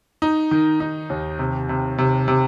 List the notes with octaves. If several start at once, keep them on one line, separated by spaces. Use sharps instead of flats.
D#4
D#3
D#4
D#2
C3
C3
C3
C3